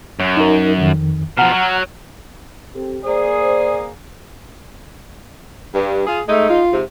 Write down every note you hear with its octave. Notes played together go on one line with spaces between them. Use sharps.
F#2
D#4 A#4
F2 D#3
B2 F3 F#5 A#5 F6
F#3
C4 G4 A4
A#3 G#4 C5 D5
G2
F4 G#4
G#3 A3 D#4
F4
G#2 C3